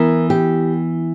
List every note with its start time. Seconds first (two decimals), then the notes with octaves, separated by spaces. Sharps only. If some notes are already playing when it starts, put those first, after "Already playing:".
Already playing: E3 B3 E4 A#4
0.30 G4